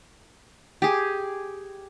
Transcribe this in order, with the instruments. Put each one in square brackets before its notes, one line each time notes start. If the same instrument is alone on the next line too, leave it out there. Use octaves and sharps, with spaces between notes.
[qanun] G4 G#4